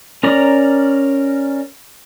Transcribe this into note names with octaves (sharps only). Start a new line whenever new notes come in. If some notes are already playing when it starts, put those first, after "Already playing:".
C#4 A#4 D5 A#5